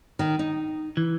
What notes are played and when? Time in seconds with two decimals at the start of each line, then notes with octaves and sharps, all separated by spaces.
0.19 D#3
0.39 D#4
0.97 E3